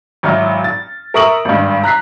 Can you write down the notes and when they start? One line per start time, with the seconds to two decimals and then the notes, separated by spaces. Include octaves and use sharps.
0.23 G#1 F#3 E4 F6
0.64 A6
1.14 A#4 E5 C#6 D#6 D7 F#7
1.45 G#1 G2
1.84 A#5 F#6 B6 C7